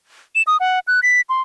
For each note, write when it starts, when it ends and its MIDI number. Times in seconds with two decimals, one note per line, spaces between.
0.35 0.42 100
0.47 0.57 87
0.60 0.79 78
0.88 1.00 90
1.03 1.21 95
1.29 1.42 84